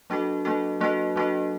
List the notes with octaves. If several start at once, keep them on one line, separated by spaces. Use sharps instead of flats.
F#3 A#3 D4 F#4 A4
F#3 A#3 D4 F#4 A4
F#3 A#3 D4 F#4 A4
F#3 A#3 D4 F#4 A4